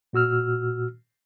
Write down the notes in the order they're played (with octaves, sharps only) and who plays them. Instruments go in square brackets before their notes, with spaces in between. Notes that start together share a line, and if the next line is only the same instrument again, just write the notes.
[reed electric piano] A#2 F#4 E6 F6